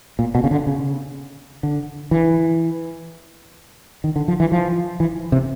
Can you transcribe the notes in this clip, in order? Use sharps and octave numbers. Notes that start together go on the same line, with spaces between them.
A#2
B2
C#3
D3
C#3
D3
E3
D#3
D3
F3
E3
F3
E3
C3